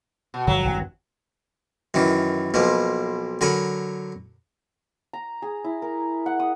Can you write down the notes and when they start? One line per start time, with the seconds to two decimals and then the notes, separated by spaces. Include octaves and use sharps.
0.34 B2
0.47 G1 D3 F3 F#3
0.65 G#1 E2 G2
1.94 F#2 D#3 E3
2.54 B1 B2 F3 A#3
3.41 D3 F#3 A#4 G#5 B5
5.13 A#5
5.42 G#4
5.64 E4
5.82 A#4
6.26 F#5
6.40 D#6